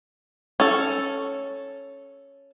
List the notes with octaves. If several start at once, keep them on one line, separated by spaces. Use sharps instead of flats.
C#4 A4